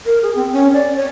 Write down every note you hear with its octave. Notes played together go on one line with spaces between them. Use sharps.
A#4
G#4
C4
C#4
D5
C#5